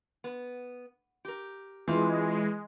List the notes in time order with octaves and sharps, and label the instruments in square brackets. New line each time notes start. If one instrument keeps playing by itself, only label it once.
[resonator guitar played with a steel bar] B3
G4 A#4
[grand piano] E3 [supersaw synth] G#3 [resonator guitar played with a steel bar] C4 F4